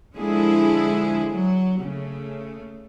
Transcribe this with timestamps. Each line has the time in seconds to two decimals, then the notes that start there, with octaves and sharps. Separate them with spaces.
0.14 D3 F3 G#3 E4 G#4
1.29 F#3
1.81 C#3 A3